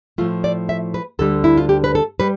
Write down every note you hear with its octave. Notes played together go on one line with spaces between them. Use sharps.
A2 F3 A3 F4
D5
E5
B4
D2 D3 G3 A4
E4
F4
G4
B4
A4
G3 B4